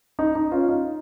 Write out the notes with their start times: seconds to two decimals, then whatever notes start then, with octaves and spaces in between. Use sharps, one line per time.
0.19 D#4
0.35 D#4
0.52 C#4 F4
0.69 D#4